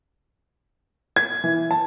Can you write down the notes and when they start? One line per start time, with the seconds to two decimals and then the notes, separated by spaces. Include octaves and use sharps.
1.16 G#6
1.44 E3
1.71 A5